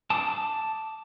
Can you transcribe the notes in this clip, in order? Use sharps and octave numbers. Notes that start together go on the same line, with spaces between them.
A5 D6 D#6